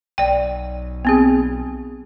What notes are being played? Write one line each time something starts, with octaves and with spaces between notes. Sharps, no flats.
B1 D5 G5
B3 C4 G#4